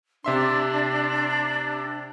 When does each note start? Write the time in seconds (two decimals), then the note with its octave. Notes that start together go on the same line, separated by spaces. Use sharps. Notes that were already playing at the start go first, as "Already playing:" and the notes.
0.24 C3 D4 E5 C6